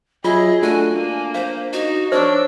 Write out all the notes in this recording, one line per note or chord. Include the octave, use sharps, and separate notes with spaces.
F#3 F4 G#4 D#5 E5
A3 D4 F#4 A4 G#5
A#3 D4
C5 F5
D#4 F#4
D4 C5 C#5 C#6 E6